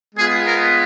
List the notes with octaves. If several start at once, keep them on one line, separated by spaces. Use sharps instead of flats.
G#3 B3 F4 G#4
A#4